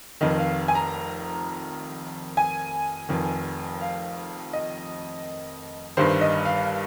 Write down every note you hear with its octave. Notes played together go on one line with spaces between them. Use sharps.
F1 F2 D#3 D#5
F5
G#5
A#5
G#5
F1 F2 D#3
F5
D#5
G1 G2 D#3 C5
D#5
F5